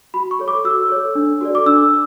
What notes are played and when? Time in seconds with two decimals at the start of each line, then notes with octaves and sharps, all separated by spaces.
0.14 F#4 B5
0.31 C#6
0.39 A4 C#5
0.48 D6
0.65 F#4 E6
0.90 A4 C#5
1.15 D4
1.41 F#4 A4 D5
1.55 D6
1.66 D4 E6